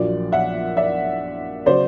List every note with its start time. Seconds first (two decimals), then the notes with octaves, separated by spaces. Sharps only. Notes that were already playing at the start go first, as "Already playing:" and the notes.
Already playing: A#1 A#2 F#3 D5
0.32 E5 F#5
0.77 D5 E5
1.66 C#3 F#3 C5 D5